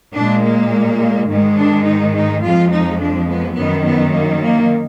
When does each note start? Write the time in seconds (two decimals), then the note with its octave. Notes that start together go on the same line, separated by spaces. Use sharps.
0.15 A#2 G#3 D4
0.44 A#3
1.30 G#2 D#3 G#3
1.57 D4
1.86 D#4
2.15 D#4
2.43 F2 F3 G#3 F4
2.71 D#4
3.00 D4
3.29 B3
3.56 F#2 D#3 F#3 B3
3.86 B3
4.13 A#3
4.42 A#3